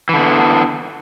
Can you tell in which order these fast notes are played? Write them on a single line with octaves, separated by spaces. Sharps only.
E3 D3 B3